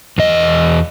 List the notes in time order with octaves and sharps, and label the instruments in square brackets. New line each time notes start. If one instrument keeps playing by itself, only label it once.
[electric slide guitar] E2 D#5